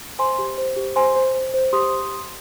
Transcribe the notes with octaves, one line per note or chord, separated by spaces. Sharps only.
C5 G#5 C6
G4
C5
G4
C5 G#5 C6
C5
C5
C5
G4 C6 D#6